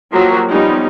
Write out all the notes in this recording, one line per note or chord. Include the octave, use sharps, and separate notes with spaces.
F3 F#3 A#3 F#4 G4
F3 G3 B3 C#4 D#4